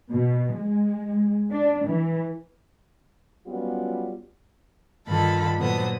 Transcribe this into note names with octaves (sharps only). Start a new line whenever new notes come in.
B2
G#3
D4
E3
F#3 G3 B3 C#4 F4
G2 D3 D#3 F4 A4 B5
A#2 D3 F#3 B3 C5 D#6